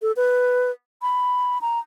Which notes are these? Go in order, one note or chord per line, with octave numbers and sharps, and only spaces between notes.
A4
B4
B5
A#5